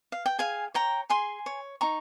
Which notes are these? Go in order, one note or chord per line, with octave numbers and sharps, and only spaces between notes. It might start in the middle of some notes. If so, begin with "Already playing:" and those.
F5
G5
G#4 F5 G#5
C#5 G5 A#5
G#4 G#5 C6
C#5
D#4 A#5 C#6